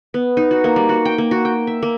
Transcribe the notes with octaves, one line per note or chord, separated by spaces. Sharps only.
B3
D#4
F#4
A#3
G3
F#4
G5
A#3
F#4
G5
E5
A#3